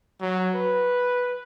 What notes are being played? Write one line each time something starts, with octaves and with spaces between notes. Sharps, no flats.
F#3
B4